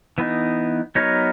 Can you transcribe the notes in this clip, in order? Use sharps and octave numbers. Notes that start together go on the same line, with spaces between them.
E3 B3 D#4
F#3 B3 D#4 A#4 C#5